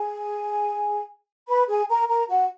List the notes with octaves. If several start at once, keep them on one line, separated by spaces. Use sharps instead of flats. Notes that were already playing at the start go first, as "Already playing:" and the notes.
Already playing: G#4 G#5
B4 B5
G#4 G#5
A#4 A#5
A#4 A#5
F#4 F#5